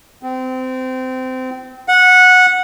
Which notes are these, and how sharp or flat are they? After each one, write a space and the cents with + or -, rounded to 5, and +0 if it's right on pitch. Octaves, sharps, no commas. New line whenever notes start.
C4 -25
F#5 -15